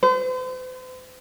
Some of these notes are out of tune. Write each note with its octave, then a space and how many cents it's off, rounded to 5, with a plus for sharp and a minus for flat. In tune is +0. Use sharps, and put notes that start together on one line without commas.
C5 -45